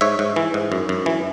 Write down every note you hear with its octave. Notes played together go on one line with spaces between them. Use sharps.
G#2 C#5 E5
G#2
E3
G#2
F#2
F#2
E3